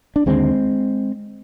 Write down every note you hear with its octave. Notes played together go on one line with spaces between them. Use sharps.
D4
D#2 D3 G#3 C4